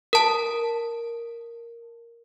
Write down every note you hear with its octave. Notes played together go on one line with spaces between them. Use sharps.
A#4 A5